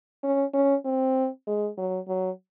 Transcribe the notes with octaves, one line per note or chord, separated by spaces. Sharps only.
C#4
C#4
C4
G#3
F#3
F#3